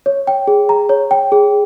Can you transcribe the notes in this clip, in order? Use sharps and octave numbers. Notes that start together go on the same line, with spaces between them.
C#5
G5
G#4
A#5
C#5
G5
G#4